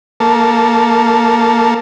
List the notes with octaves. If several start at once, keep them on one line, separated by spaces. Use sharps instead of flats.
A#3 A4